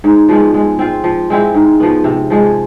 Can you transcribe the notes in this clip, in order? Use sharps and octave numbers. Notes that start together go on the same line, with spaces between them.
G#2
F3 G#3 B3
G#3
C4 F4
F3
G#3 C4 E4
G#2
F3 B3
C3
F3 G#3